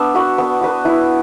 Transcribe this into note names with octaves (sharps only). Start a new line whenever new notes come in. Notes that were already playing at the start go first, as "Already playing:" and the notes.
Already playing: B3 D4 E5
F#4 B4
B3
F#4 B4
E4